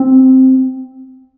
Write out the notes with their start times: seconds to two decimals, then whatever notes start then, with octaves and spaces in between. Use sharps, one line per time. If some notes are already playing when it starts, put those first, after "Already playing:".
Already playing: C4